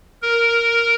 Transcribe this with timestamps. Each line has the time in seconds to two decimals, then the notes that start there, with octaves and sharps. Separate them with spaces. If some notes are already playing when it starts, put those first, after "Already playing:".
0.22 A#4